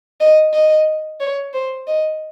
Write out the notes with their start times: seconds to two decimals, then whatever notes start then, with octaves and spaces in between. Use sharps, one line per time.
0.20 D#5
0.54 D#5
1.20 C#5
1.54 C5
1.87 D#5